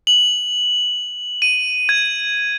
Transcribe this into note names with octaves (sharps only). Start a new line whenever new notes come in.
F#7
D#7
G#6